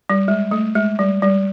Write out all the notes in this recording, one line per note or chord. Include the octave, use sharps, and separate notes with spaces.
G3
G#3
A3
G#3
G3
G3